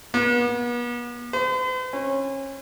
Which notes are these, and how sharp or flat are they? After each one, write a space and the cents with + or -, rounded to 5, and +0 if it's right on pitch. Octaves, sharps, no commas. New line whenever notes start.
B3 -40
C5 -45
C#4 -30